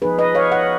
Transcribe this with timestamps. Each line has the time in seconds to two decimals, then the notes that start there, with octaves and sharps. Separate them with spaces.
0.02 F3 B3 D#4 G#4 B4
0.18 B4 D#5
0.35 C#5 F5
0.52 D#5 F#5